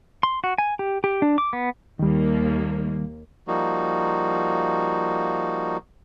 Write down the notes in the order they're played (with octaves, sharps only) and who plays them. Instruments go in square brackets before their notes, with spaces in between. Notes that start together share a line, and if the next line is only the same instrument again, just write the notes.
[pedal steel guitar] C6
F#4
G#5
G4
G4
D4
D6
B3
[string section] D#2 A#3 [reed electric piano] D#3 G3
[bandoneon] F3 G3 A#3 D#4 F#4